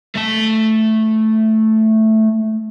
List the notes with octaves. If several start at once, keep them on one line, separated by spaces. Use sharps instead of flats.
A3 A5